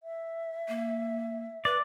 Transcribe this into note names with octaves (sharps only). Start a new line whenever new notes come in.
E5
A#3
B4 D5